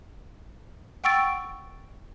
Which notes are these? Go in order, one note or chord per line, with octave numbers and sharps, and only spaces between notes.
F#5 G5 C#6 E6 A6 D7